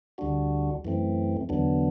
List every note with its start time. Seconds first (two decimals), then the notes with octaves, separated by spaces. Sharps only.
0.18 D2 D3 G3 D4 F#4
0.85 F#2 E3 A3 C4
1.49 E2 D3 F#3 B3 D4